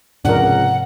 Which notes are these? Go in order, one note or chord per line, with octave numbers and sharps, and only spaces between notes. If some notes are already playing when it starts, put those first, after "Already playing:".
C#2 G#2 C3 F3 D4 A#4 F#5